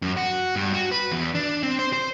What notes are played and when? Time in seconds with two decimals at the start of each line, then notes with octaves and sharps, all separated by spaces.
0.02 F#2
0.17 F#4
0.56 G2
0.74 F#4
0.92 B4
1.12 E2
1.35 D4
1.63 C4
1.79 C5
1.93 C5